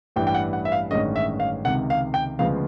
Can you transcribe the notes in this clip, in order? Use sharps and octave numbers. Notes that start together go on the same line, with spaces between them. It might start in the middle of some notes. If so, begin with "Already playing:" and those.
A1 G2 E3 G3 G5
G5
F#5
F#5
E5
F5
A1 G2 D#3 G#3 C#4 D#5
E5
F5
C#2 C3 D#3 F#5
F5
G5
D2 C#3 F3 G#3 B3 F5